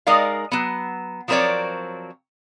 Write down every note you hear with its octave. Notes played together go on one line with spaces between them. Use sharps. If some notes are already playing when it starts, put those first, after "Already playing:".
G#3 D#4 A#4 D5 F5
F#3 B3
F3 F#3 C4 A#4 C#5 D5